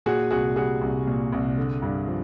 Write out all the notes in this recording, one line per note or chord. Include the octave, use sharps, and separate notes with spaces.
A#2 F#4 G#4
C2 F#4 G#4
G3 F#4 G#4
C2
A#2
C2
D3
G2
F3